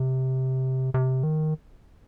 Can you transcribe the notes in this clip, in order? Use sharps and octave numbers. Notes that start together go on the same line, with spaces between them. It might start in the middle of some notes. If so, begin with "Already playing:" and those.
Already playing: C3
C3
D#3